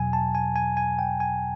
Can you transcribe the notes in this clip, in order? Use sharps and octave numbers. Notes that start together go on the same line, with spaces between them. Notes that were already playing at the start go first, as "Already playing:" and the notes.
Already playing: E2 B2 F#3 G#5
A5
G#5
G#5
G#5
G5
G#5